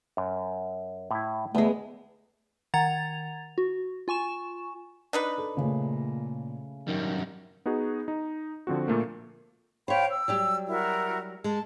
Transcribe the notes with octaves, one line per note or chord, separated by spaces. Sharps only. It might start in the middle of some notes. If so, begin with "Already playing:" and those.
F#2
A2 E4
E2 G#3 A3 B3
D#3 F#5 A#5 G#6 A6 F7
F#4
F4 G#5 C#6 E7
D4 D#4 B4
A4
A#2 C#3 A3
F#2 D#3 G3
B3 D#4 F#4 G#4
D#4
D3 F3 C4 F#4
A#2 A3 A#3
C5 C#5 F5 G5 B5
E6
F#3 G3 G4
E4 F#4 A#4
G#3 A5